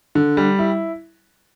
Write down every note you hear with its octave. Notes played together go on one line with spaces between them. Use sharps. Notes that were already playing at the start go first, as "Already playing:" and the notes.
D3
G3
E4